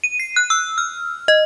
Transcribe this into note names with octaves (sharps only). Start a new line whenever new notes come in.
D#7
C7
F#6
E6
F6
D#5